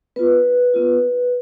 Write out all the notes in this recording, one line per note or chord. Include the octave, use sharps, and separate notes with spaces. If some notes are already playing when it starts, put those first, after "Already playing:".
B3 F4 B4
B3 F4